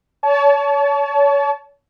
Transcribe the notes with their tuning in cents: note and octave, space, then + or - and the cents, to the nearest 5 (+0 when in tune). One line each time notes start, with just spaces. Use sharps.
C#5 +30 A5 -25